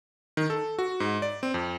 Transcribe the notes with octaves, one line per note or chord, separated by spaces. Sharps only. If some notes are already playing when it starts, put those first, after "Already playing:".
D#3
A4
F#4
G#2
D5
C4
F2